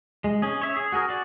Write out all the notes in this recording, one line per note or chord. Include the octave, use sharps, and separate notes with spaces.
G#3
C#4 G#4
C#5 E5
G#4
F#4 G#4 A#4
F#4 D5